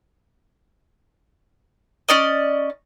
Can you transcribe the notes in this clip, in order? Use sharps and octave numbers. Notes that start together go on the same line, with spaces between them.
C#4 D5 D#5